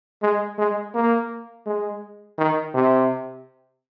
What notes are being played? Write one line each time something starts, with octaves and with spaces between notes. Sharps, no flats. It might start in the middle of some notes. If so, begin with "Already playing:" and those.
G#3
G#3
A#3
G#3
D#3
C3